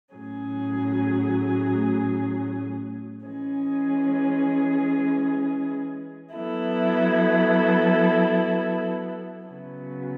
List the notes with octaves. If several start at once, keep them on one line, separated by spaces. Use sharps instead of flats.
A2 F#3 C#4 G#4
E3 G#3 C#4 G#4
F#3 B3 E4 A4
C#3 F#3 B3